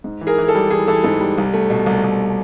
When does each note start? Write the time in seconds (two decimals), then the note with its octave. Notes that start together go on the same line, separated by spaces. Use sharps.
0.04 G#2
0.21 E3
0.27 G#4 A#4
0.38 E3
0.48 A4
0.55 G3
0.71 E3 G#4
0.88 E3 A4
1.04 G#2 A4
1.20 G3
1.38 C2
1.53 A3
1.70 B2
1.86 C2
2.04 C2